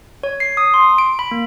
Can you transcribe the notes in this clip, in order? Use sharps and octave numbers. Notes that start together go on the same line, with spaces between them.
C#5
C7
D#6
C6
D7
B5
A#3